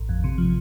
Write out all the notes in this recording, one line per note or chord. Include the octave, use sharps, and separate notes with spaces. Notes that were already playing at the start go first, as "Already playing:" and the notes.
Already playing: A1
F2
C3
F3